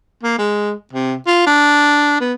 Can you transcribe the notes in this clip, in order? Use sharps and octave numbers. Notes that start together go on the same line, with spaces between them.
A#3
G#3
C3
F4
D4
B3